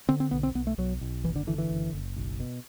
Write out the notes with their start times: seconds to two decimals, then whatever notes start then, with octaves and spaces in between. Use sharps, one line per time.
0.09 D3 C4
0.20 C4
0.31 B1 B3
0.43 C4
0.55 B1 B3
0.67 A3
0.78 B1 F#3
1.01 B1
1.24 F#1 E3
1.36 D3
1.47 D3 E3
1.58 E3
1.70 F#1
1.93 F#1
2.16 B1
2.40 B2